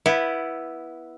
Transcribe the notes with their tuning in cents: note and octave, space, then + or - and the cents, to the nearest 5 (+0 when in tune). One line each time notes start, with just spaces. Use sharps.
B3 -10 E4 +0